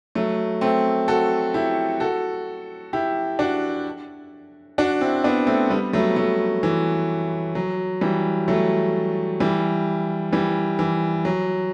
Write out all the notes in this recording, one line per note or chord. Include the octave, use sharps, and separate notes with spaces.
F#3 A3
A3 C4
F#4 A4
E4 G4
F#4 A4
E4 G4
D4 F#4
D4 F#4
C4 E4
B3 D4
A3 C4
G3 B3
F#3 A3
F#3 A3
E3
F#3
E3 G3
F#3 A3
E3 G3
E3 G3
E3
F#3